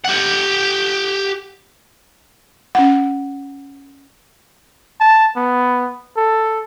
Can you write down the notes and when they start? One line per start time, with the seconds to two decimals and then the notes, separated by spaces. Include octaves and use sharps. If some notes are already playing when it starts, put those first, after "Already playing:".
0.05 G4 F#5
2.75 C#4 F#5
5.00 A5
5.36 B3
6.17 A4